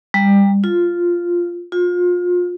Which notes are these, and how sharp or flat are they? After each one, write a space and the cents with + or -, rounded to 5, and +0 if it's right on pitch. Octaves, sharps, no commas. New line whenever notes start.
G3 +25
F4 -5
F4 +30